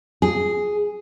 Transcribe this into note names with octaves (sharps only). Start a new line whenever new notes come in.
G#4